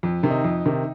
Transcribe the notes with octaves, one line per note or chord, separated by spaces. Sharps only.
F2
C3 D#3
D#4
F2
C3 D#3